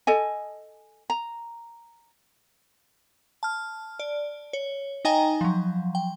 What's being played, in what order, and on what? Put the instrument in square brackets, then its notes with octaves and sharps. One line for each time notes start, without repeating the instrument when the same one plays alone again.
[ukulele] A4 D#5 G#5
A#5
[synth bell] A5 F6
D5
C#5
D#4 D#5 G5 G#5 A#5
F3 F#3
G5